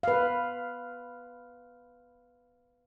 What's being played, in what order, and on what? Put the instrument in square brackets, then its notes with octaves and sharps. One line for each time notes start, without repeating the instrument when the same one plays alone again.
[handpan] B4 F5